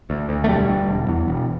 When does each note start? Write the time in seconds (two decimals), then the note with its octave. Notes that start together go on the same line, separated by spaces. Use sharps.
0.10 D2
0.29 D2
0.44 A3
0.49 E1 G3
0.69 D3
0.88 E1
1.08 E2
1.28 E1